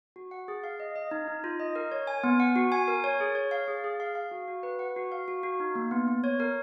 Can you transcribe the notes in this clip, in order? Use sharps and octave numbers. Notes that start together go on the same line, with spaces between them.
F#4
F#5
G#4
F5
D#5
D#5
D#4
D#4
F4
D#5
A#4
C#5
G#5
B3
F#5
F#4
G#5
A#4
C#5
G#4
C#5
F5
G#4
G#4
F5
F5
F#4
F#4
B4
F#5
F#4
F5
F#4
F#4
D#4
A#3
B3
B3
C#5
A#4